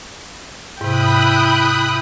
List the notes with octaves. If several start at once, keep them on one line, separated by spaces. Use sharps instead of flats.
G#2 C3 E4 G5 B5 D#6 F#6